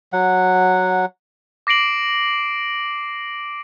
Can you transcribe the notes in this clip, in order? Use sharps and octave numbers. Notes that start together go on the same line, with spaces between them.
F#3 F#5
D6 A#6 C7 D7 F#7